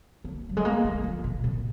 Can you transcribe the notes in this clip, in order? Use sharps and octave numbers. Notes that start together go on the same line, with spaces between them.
A#3
F#3
G#3
A#3
G#3
F3
A#2
A#2